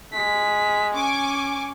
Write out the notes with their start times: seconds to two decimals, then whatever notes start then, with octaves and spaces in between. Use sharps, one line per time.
0.14 G#3 B6
0.95 C#4 G#5 C#6 D6